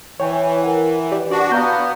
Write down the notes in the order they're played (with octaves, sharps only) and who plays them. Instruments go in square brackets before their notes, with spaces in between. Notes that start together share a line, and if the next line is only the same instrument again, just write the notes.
[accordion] E3 [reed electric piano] C#5 G5 G#5
[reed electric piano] A#4 F#5
G4 D5
[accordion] D4 F#4 [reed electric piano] D5
[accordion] B3 [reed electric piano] F5 A#5 G6